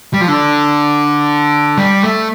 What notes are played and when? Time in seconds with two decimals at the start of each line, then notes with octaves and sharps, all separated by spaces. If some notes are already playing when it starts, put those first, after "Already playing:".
0.14 G3
0.21 F3
0.28 D3
1.78 G3
2.03 A3